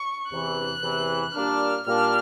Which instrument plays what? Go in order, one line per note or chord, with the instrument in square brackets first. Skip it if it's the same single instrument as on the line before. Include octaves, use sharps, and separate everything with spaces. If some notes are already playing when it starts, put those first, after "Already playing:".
Already playing: [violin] C#6
[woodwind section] E2 C3 E3 [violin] F#6
[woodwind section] E2 C3 E3
[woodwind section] A#2 G3 A#3 D4 [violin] F6
[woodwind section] A#2 G3 A#3 D4 [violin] F6